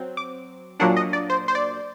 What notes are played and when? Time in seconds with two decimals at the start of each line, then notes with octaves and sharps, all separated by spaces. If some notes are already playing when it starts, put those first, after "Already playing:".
Already playing: F#3 C4
0.17 D6
0.80 A#2 F#3 A#3 D4 F#5
0.97 D#5
1.13 D5
1.30 C5
1.48 C5
1.55 D5